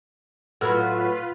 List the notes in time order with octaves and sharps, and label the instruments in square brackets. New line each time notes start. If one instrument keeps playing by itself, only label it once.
[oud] A2 F#3 B3 [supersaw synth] F4 B4 [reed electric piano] F#5 E6 F6